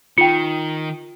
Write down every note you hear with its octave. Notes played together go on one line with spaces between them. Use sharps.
D#3 F4 G5 C#7